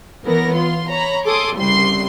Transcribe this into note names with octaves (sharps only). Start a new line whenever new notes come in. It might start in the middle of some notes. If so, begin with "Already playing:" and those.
E3 B3 A#4 C#5 A#6
F4 C6
C#5 A#5 B5
G#4 A4 C6 D6 D#6
C2 C#3 G3 C6 C7